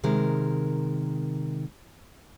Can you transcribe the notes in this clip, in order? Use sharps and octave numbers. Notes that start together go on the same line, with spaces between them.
C3 D#3 G#3 A#4